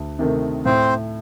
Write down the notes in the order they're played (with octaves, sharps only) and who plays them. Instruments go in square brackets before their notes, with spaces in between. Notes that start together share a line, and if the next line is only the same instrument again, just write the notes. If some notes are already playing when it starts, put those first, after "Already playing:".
Already playing: [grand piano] D2
C3 D#3 A3
[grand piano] A2 [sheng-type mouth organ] C4 C5